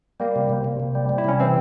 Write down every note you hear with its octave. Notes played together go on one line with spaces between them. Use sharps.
G3 A#3
C3
C3
C3
C3
G3
G3
E4
C3 C#4
E3 C4